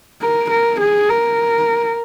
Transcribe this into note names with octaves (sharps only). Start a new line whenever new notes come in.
A#4
A#4
G#4
A#4